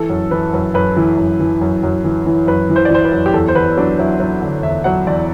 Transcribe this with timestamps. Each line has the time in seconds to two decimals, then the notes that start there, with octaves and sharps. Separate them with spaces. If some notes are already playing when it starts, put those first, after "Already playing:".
Already playing: E3 A4
0.10 F#2
0.31 E3 B4
0.53 F#2 B4
0.74 F#2 B4
0.97 E3
1.17 F#2
1.40 E3
1.61 F#2
1.83 F#2
2.04 E3
2.26 E3
2.47 F#2 B4
2.70 E3
2.76 C5
2.85 D5
2.90 E3 C5
3.05 B4
3.12 F#2
3.26 G4
3.33 E2 A4
3.48 C5
3.55 E2 B4
3.77 F#3 D4
3.99 F#3 E4
4.20 F#3
4.42 D3
4.63 E2 E5
4.84 F#3 F#5
5.07 E2 D5